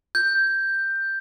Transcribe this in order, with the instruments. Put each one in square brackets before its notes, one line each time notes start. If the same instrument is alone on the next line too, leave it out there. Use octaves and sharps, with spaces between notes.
[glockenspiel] G6